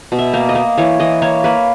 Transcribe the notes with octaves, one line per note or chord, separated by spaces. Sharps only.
B2
E5
A#3
D#5
A#3
E3 C#5
E3 D#5
A#3 C#5
A#3 B4